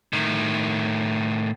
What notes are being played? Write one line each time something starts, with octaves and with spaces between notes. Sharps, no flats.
A2 D#3